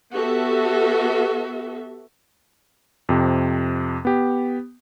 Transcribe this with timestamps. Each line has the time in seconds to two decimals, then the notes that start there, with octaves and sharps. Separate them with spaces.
0.13 B3 F#4 G4 A4 E5
3.09 F2 C3
4.05 B3 G4